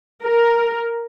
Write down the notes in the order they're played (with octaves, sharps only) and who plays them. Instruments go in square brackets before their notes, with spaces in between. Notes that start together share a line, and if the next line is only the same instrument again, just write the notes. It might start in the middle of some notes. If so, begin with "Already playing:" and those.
[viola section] A#4